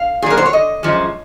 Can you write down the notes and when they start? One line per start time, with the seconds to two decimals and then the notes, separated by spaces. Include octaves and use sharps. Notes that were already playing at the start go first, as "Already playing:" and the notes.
Already playing: F5
0.22 A#2 G#4
0.26 F#3 A#4
0.37 C5
0.46 C#5
0.53 D#5
0.83 F#2 F3 G#3